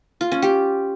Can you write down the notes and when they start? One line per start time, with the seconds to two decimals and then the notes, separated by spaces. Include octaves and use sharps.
0.21 F4
0.32 C#4
0.42 G4